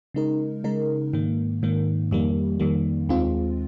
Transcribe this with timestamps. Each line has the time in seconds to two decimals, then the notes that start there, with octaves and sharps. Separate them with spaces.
0.14 C#3 G#3 D#4 A#4
0.64 C#3 G#3 D#4 A#4
1.13 G#2 D#3 A#3
1.63 G#2 D#3 A#3
2.11 F2 D#3 G3 A#3
2.60 F2 D#3 G3 A#3
3.09 D#2 D#3 G#3 C4 F4